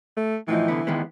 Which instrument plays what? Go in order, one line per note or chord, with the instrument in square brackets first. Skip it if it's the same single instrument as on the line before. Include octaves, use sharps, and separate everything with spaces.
[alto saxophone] A3
[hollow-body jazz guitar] A2 F3 D#4 [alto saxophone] E3
[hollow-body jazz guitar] C2 D3 B3
D#3 G#3 B3